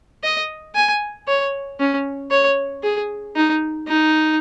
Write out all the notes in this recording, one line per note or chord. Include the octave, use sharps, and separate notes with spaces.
D#5
G#5
C#5
C#4
C#5
G#4
D#4
D#4